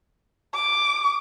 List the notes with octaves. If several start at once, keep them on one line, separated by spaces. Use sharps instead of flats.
D6